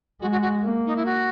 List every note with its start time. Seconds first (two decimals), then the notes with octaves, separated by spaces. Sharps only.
0.21 G#3 F#4
0.32 F#4
0.42 F#4
0.64 A#3
0.86 D#4
0.96 E4
1.06 F#4